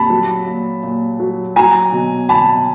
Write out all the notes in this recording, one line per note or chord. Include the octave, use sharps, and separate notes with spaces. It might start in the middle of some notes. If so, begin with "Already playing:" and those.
Already playing: A#2 G3 A5 B5
F#3
A#2
A#2
F#3
F#3 G#5 A#5
B2
B2 A5 B5